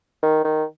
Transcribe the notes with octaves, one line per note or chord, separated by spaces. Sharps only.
D#3
D#3